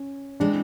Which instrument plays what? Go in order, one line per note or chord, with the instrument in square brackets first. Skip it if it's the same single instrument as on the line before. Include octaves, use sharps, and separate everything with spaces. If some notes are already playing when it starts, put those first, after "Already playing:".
Already playing: [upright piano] C#4
[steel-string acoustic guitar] E3 G#3 C4 [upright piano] D4